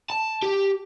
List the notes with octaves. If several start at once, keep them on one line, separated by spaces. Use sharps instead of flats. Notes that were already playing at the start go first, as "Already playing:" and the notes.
A5
G4